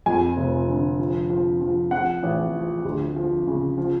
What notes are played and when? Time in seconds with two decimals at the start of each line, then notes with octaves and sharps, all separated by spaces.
0.06 F2 G#5
0.37 F1
0.68 D3
0.99 F3
1.30 F3
1.61 F3
1.91 F3 F#5
2.23 A1
2.53 F3
2.85 D2
3.16 F3
3.47 C#3
3.78 F3